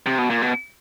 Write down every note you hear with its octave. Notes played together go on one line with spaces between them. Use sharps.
C3
B2
A#2
B2